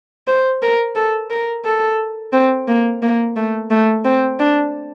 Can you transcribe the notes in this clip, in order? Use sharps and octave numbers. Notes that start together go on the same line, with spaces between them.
C5
A#4
A4
A#4
A4
C4
A#3
A#3
A3
A3
C4
D4